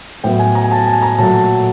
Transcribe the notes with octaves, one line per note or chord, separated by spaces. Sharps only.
A2 F#3 B3 G5
G#5
A#5
G#5
A5
G#5
A#5
A#2 F#3 A3 A5